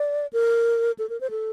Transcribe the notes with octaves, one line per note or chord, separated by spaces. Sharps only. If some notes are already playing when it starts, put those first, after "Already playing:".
Already playing: D5
A#4
A4
A#4
C5
A4